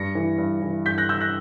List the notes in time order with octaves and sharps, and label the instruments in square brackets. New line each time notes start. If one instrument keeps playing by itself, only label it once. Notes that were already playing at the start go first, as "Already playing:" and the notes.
Already playing: [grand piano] G2 A#6 C#7
E3
G2
E3
G2 G6 B6
F#6 A#6
E3 E6 G6
F#6 A#6